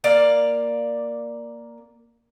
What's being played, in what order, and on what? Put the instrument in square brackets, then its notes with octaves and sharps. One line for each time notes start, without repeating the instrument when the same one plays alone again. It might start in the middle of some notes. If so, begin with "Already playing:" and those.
[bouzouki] A#3 D5 F5